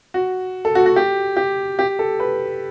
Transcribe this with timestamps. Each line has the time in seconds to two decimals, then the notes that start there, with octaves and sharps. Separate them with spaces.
0.14 F#4
0.65 A4
0.75 F#4
0.86 F#4
0.96 G4
1.37 G4
1.79 G4
1.99 A4
2.20 B4